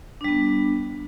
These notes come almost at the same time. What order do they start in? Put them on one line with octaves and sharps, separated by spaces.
D4 G3 B3